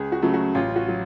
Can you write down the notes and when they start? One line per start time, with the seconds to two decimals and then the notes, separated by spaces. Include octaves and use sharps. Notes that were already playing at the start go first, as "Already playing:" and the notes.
Already playing: C#2 G#4
0.12 F#4
0.22 C#3 F#3 A3
0.34 F#4
0.55 A1 F4
0.76 F#4
0.88 F#3